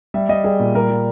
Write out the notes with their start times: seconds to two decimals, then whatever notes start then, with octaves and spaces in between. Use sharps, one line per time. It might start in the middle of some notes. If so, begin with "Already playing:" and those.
0.14 G3 E5
0.29 G3 D#5
0.44 G3 G#4
0.59 A#2
0.75 G3 A#4
0.90 G3